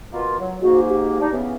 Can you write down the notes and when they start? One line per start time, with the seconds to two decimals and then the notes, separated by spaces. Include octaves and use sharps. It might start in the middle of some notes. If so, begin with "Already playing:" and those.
0.12 B2 A#3 F4
0.39 F#3
0.62 G#2 A#3 F#4
0.90 G4
1.21 D4 D#4
1.32 C#3 E3 B3